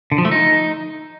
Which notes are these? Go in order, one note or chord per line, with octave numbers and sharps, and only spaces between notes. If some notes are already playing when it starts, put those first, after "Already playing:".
D3
F3
A3
D#4